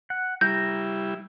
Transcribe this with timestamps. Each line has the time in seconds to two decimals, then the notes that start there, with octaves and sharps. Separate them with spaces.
0.10 F#5
0.41 G3 E4 A#5 G6